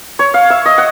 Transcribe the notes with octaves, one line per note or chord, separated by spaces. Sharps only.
C#5
F5
E5
D#5
F#5